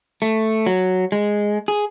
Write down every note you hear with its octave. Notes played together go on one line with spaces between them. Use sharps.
A3
F#3
G#3
G#4